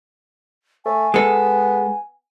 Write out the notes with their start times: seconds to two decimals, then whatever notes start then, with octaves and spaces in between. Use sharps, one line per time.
0.85 A3 G#5
1.14 G#3 B3 A4